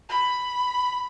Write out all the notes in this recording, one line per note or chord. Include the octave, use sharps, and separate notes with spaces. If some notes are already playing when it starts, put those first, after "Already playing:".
B5